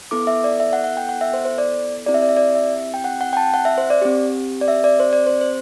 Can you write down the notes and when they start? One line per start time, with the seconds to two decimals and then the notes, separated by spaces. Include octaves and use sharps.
0.11 B3 E4 A4 D6
0.27 E5
0.44 D5
0.60 E5
0.73 F#5
0.84 F#5
0.97 G5
1.09 F#5
1.21 E5
1.34 C5
1.45 C5
1.58 D5
2.06 C4 E4 G4 D5
2.14 E5
2.22 D5
2.29 E5
2.37 D5
2.55 E5
2.94 G5
3.04 F#5
3.21 F#5
3.33 G5
3.37 A5
3.54 F#5
3.65 E5
3.78 C5
3.90 D5
4.02 C4 G4
4.61 D5
4.68 E5
4.84 D5
5.00 C5
5.13 D5
5.27 C5
5.41 C5